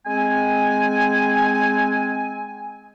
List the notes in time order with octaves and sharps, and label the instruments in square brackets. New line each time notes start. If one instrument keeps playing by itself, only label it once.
[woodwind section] G#3 C4 G#5